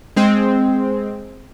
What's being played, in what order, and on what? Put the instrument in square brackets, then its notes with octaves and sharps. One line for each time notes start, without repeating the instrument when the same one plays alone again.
[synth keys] G#3 C4